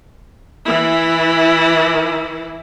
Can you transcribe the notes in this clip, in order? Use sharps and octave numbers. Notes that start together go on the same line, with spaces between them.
E3 E4